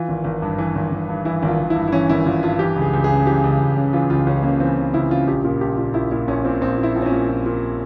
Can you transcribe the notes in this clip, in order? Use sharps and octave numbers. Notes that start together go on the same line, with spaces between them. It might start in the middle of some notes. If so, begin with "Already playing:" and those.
Already playing: E3 F4
G#1
G#1
G2
E3
G#1
G#1
G2
E3 E4
G#1
F4
G#1
E4
G2
E4
E3 C#4
G#1 E4
G#1 F4
G2 F4
E3 G4
C#2
G#4
C#2
G#4
C#3
E3 G4
C#2
C#2
C#3
E3 F4
C#2 F4
C#2 C#4
C#3 A#3
E3 C4
C#2 C#4
C#2 E4
C#3 F4
A#1 G4
A#2
A#1 G4
A#2
A#1 E4
A#2 E4
A#1 C#4
A#2 C4
A#1 C4
A#2
E4
A#1
C4
C#4
A#2
A#1
A#2